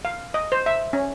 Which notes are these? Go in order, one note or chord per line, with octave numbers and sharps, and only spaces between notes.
F5
D#5
C5
E5
C#4